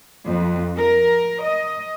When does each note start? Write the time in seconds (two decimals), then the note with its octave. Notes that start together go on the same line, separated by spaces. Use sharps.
0.25 F2
0.77 A#4
1.44 D#5